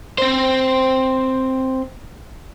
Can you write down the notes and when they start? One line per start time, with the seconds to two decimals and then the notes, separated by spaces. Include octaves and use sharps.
0.18 C4 C5